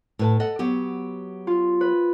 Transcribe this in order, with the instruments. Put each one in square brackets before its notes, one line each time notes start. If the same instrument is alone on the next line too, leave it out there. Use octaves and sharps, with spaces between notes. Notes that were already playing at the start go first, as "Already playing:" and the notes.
[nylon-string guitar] A2 B4 A5
A4 D#5 F#5
F#3 B3 G4
[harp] F4
B4